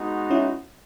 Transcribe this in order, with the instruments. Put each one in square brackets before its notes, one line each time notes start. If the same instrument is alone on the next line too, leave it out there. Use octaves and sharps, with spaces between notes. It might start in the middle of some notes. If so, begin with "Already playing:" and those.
Already playing: [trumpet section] G#3 B3 D#4 F#4
[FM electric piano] C#4 E4